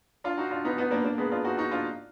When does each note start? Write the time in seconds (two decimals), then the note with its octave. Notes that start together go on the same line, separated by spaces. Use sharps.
0.24 D4 F4
0.37 D#4 F#4
0.51 D4 F4
0.65 B3 D#4
0.78 B3 D#4
0.91 A#3 D4
1.04 A#3 D4
1.18 G#3 B3
1.31 D4 F4
1.45 D#4 F#4
1.58 D#4 F#4
1.72 D4 F4